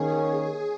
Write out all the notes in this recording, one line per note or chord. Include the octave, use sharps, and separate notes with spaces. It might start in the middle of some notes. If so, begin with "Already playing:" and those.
Already playing: D#3 A#3 C#4 G#4